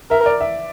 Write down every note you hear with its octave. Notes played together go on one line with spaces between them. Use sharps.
A#4 E5
D5
E5